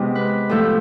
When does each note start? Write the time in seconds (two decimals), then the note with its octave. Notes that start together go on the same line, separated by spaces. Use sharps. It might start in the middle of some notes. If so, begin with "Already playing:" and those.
Already playing: C3 G#3 B3
0.15 B4
0.49 A2 F3 A3 A4